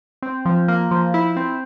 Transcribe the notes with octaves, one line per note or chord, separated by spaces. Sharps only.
C4
F3
A#3
F3
E4
C4